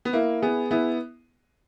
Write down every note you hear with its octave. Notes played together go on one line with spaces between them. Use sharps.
B3
A#3 E4
B3 G#4
B3 E4